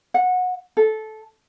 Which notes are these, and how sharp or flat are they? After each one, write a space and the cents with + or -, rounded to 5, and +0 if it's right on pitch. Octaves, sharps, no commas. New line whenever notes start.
F#5 -20
A4 -15